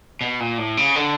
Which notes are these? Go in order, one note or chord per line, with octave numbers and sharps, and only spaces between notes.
B2
A#2
A2
C#3
D3